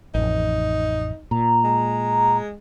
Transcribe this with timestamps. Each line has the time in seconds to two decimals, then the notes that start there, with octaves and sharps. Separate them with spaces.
0.15 A1 F2 D#4
1.31 A#2 A#5
1.64 G#3